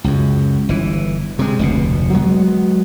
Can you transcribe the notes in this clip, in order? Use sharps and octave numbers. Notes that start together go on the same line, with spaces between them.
C#2 F#2
G1 E3
C3 G#3
F1 D2 B2
F#3 G#3 B3